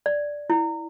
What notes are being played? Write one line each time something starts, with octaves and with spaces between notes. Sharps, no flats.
D5
E4